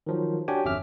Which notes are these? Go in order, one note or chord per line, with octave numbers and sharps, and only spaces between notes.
D#3 F3 F#3
D4 F#4 G4 C#5 G5 G#5
G1 F2 C#4 E5 D6 F6